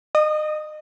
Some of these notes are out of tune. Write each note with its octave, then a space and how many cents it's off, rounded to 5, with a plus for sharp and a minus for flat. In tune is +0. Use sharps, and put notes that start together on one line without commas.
D#5 -30 D#6 +0